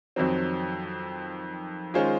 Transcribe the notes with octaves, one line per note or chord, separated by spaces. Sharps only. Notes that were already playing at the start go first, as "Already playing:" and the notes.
F2 D#3 F#3 C4
D#3 G#3 C#4 F4 C5